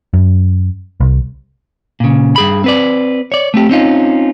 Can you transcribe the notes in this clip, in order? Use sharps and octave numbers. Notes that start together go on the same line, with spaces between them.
F#2
C2
A#2 C#3
G2 G#4 B5
C4 B4 D5
C#5 D5
A3 C4 G4
C4 C#4 D#4 F4